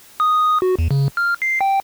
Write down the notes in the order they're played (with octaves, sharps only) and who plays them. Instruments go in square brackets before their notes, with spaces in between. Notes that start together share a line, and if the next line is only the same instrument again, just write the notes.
[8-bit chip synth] D#6
F#4
E2
C#3
F6
C7
G5